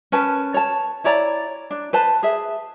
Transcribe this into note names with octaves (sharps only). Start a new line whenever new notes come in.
C#4 A#4 B4 A5
C#5 A5
E4 C#5 D5 A#5
D4
B4 C5 A5
G#4 E5